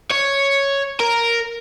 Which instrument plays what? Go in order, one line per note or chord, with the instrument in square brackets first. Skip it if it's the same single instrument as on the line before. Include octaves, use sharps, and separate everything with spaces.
[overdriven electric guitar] C#5
A#4